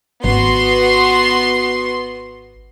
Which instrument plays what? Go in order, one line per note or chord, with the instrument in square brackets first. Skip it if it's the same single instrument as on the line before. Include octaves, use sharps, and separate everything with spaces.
[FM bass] G#1 [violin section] B3 F#4 C6